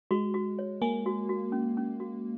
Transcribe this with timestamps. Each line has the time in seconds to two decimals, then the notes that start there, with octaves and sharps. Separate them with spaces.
0.11 G#3 F#4
0.34 F#4
0.59 C#5
0.82 A#3 G#5
1.06 F#4
1.29 F#4
1.52 C#4
1.77 C#4
2.00 F#4